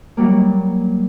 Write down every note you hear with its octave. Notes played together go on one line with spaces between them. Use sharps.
F#3 G3 A#3